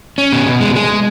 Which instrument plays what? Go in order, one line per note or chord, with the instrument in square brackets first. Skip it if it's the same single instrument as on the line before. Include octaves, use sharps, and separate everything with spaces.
[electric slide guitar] C#4
B2
B2
G#3
G#3